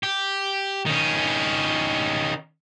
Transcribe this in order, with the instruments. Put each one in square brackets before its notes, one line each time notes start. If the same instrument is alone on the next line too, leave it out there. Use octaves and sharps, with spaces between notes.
[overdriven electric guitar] G4
D#3 C#4